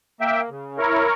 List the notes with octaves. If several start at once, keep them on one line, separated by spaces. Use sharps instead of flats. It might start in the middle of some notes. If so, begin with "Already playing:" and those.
A#3 E5 G5
C#3
E4 A#4 C#5